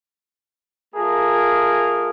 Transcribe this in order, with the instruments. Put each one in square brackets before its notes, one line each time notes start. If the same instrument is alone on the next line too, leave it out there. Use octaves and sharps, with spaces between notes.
[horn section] A3 F4 G#4 A#4